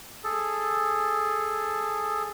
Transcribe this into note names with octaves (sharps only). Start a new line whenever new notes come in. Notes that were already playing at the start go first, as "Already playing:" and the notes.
G#4 A4